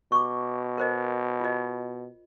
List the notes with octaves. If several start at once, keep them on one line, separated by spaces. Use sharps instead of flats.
B2 C#6 D6
A#4 C5 D#5
F4 D#5